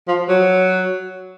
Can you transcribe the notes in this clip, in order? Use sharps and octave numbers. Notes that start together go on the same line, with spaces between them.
F3
F#3